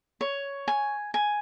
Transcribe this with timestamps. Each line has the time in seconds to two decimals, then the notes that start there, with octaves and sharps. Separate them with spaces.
0.21 C#5
0.68 G#5
1.14 G#5